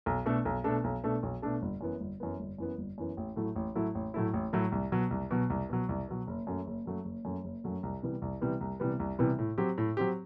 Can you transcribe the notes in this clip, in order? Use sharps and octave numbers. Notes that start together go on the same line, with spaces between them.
B1
B2 A3 D4 A4
B1
B2 A3 D4 A4
B1
B2 A3 D4 A4
B1
B2 A3 D4 A4
G1
F#2 E3 B3
G1
F#2 E3 B3
G1
F#2 E3 B3
G1
F#2 E3 B3
A1
A2 F#3 A3 E4
A1
A2 F#3 A3 E4
A1
A2 F#3 A3 E4
A1
A2 F#3 A3 E4
C2
B2 F#3
C2
B2 F#3
C2
B2 F#3
C2
B2 F#3
F#1
F#2 F#3 A3
F#1
F#2 F#3 A3
F#1
F#2 F#3 A3
F#1
F#2 F#3 A3
C2
C3 E3 G3 B3
C2
C3 E3 G3 B3
C2
C3 E3 G3 B3
C2
C3 E3 G3 B3
A2
F#3 C4 G4
A2
F#3 C4 G4